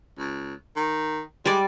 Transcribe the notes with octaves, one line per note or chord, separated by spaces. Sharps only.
C#2
D#3
G3 G#3 D5